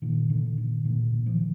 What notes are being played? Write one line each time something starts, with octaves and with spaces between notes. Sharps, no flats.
A#2 D#3
A#2 D3
A#2 D#3
A#2 D3 E3
A#2
D#3 F3